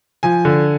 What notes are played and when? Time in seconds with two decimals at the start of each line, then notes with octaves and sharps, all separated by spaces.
0.23 F3 G#5
0.45 D3